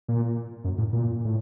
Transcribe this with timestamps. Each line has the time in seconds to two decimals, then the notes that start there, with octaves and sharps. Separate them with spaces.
0.08 A#2
0.64 F#2
0.78 A2
0.93 A#2
1.25 A2